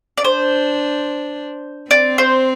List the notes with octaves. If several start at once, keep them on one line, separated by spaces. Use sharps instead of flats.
D5
D4 C5
C4 D5
C5